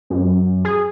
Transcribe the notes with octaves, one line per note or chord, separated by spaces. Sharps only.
F#2
G#4